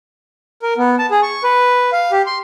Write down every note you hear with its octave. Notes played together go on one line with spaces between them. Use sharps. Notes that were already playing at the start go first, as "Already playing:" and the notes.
A#4
B3
A5
G#4
C#6
B4
F5
G4
C6